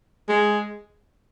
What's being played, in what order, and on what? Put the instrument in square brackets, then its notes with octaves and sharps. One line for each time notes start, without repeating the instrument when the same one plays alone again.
[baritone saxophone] G#3